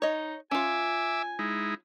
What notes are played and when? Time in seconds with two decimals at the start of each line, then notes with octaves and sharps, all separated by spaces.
0.02 D#4 C#5 D#5
0.51 C#4 F4 E5 G#5 D6 E6
1.39 G#3 D#4 E4